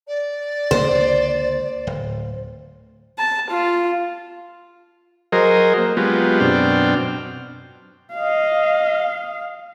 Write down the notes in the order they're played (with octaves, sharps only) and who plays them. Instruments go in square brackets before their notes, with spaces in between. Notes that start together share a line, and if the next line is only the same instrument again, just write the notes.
[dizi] D5
[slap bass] C#2 D3 A#3 [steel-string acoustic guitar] C5
[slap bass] D1
[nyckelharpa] A5
F4
[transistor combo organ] F#3 G#4 A#4 C5 D#5
A#3
F#3 G#3 B3 F4 G4
F#2 B2 C4 D4 G5 F6
[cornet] D#5 [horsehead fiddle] F5